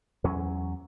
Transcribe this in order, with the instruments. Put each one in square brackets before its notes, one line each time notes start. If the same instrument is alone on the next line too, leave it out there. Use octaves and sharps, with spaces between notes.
[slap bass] E2 F#3 C#4